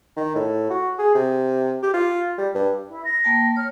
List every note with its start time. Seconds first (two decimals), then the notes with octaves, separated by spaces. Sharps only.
0.17 D#3
0.35 A2
0.70 F#4
0.99 G#4
1.15 C3
1.82 G4
1.94 F4
2.38 G3
2.55 G2
2.89 E4
3.04 A#6
3.24 A#3 G5 A5
3.56 C#5 F6